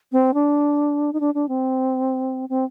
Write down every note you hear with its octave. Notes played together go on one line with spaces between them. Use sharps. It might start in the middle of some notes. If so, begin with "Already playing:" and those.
C4
D4
D#4
D4
D4
C4
C4